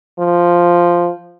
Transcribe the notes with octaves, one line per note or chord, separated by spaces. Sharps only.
F3